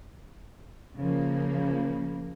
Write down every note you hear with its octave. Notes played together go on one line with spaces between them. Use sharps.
C#3 F3 A#3